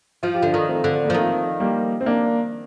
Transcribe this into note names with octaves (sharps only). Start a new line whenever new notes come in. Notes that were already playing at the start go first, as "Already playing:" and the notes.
F3 F4
G4
D3 D4 F4
D#3
A3 C4
D3
A#3
F3
D#3 A3 C4
G3 A#3
C4
A#3 D4